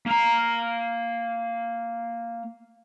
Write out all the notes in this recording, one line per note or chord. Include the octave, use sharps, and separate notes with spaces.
A#3 A#5